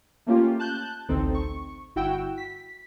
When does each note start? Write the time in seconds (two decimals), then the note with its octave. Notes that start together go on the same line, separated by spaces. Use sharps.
0.26 A3 A#3 C#4 F4 G4
0.59 A5 F#6 G6
1.09 A1 D2 C4 D#4 A4
1.34 C#6
1.96 G1 E4 F#4 G5 E6
2.38 B6